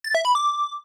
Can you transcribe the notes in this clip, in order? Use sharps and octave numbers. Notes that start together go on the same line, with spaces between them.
A6
E5
B5
D6